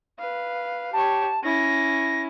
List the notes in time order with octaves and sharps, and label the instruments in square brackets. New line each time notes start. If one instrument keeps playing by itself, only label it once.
[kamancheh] B4 F5
[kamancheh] G4 C#5 [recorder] A5
[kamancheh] C#4 E4 [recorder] A#6